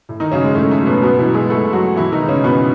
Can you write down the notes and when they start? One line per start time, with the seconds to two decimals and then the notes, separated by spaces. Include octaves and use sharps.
0.09 A2
0.20 D#3 D#4
0.32 C#3 F#3 C#4
0.44 G#3
0.55 A2 A3
0.71 A3
0.80 F#3
0.87 B2 B3
1.02 B2 B3
1.19 E3 E4
1.26 F#3
1.34 G#3 G#4
1.50 B2 A3 A4
1.73 F#3 F#4
1.96 B2 E3 E4
2.12 D#3 D#4
2.21 G#3
2.28 C#3 C#4
2.44 B2 B3